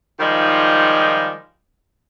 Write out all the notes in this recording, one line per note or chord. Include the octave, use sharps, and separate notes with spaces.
D#3 F3 G3 G#3 D#4 F4